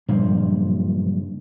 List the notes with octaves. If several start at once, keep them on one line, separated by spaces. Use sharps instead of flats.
F#1 G2 A#2 F3